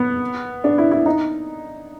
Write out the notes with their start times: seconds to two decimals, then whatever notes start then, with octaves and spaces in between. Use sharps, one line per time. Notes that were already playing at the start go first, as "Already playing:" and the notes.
Already playing: B3
0.64 D4
0.78 E4
0.91 E4
1.06 D#4